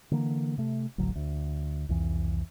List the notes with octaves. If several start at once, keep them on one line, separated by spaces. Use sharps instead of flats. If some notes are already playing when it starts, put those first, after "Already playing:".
D3 E3 A#3
C3 A3
D1 A1 D3 F#3
D2
C2 F2 E3